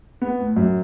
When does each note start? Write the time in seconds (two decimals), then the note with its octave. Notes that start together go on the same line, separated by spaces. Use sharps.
0.22 B3
0.40 A2
0.57 F#2